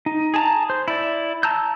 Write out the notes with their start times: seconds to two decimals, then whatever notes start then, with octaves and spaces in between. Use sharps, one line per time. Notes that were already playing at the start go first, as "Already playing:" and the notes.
0.06 D#4
0.34 G#4 A5 A#5
0.70 C5
0.88 E4 D5
1.43 A5 A#5 E6 G6